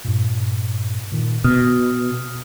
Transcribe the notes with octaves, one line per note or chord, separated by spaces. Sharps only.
G2 A#2
A#2 D#3
B2 D#6 F6